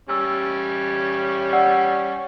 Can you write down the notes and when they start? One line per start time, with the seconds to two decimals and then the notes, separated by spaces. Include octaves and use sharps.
0.09 G3 C#4 E6
1.53 D5 F#5 E6